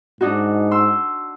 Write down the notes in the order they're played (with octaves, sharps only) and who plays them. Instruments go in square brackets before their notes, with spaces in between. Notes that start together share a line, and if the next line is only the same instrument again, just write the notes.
[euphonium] G#2 [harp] D4 D#4 F#4
[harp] C6 E6